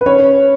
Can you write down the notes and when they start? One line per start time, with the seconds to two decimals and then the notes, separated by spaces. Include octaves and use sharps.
0.01 B4
0.06 C#4 C#5